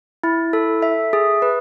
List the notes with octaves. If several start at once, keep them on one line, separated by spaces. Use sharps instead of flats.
E4
A4
E5
G#4
B4